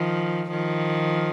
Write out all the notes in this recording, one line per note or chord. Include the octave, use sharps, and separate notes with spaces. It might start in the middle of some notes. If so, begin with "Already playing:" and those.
Already playing: D#3 F3
D#3 F3